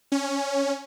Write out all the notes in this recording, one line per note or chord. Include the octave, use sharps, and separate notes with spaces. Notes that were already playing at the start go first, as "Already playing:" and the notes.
C#4